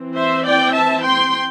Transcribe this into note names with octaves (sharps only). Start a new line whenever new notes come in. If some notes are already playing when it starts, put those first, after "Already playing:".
Already playing: E3 C4
C5 E5
D5 G5
E5 A5
G5 C6